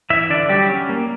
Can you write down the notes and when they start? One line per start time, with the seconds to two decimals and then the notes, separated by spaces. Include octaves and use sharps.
0.10 E3 E4 E5
0.30 D3 D4 D5
0.49 F#3 G3 G4
0.69 C#4
0.89 A#3